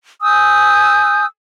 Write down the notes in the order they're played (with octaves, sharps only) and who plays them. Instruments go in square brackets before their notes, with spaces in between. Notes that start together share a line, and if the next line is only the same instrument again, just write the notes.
[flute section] G#5 D#6 E6 G6